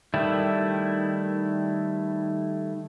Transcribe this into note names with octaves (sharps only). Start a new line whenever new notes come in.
D#3 G3 A3 E4